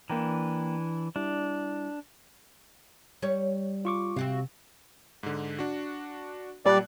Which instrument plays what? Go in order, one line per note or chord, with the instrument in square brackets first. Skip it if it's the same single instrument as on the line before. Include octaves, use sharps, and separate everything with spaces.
[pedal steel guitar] E3 D4 [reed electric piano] A#3 G5 A#5
[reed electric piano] G3 E4 [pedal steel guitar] D4
[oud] G3 C#5
[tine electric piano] F4 C#6 D6
[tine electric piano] C3 [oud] C4 F#4 F5
[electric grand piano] G#2 D3
D4 F#4
[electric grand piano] A#2 A5 F#6 [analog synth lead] G3 [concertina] D5